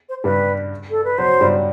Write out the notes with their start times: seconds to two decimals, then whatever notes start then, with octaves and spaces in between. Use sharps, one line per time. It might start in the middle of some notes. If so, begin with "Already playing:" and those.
0.09 C5
0.24 G2 G3 B4
0.91 A4
1.04 B4
1.18 F#3 C5
1.41 G2 G3